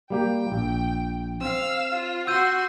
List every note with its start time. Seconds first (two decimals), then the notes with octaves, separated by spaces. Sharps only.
0.10 G3 A#3 G4 G5
0.52 A#1
1.41 C4 F5 E6
1.94 F4
2.27 F#4 C6 E6 G6 D#7